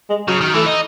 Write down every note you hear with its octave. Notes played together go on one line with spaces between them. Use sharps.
G#3
C#3 F#3
D#3
E3 A3
D#4